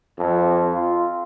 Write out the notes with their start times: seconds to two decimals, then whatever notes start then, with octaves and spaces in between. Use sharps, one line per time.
0.18 F2
0.74 F4